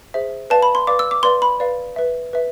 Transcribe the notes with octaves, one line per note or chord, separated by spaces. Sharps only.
G#4 C5 E5
B4 D5 F5 A5
B5
C6
B4 D5 F5 D6
E6
D6
B4 D5 F5 C6
B5
B4 D5 F5
B4 E5
B4 E5